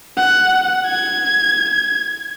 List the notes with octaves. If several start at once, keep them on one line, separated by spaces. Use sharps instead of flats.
F#5
G#6